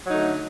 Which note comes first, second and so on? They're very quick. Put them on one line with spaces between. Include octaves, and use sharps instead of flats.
F#3 D#4 A3 D3